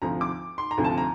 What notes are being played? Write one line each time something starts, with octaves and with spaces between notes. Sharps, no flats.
D2 C3 F3 A#5
D6
C6
A#5
D2 C3 F3
A5
A#5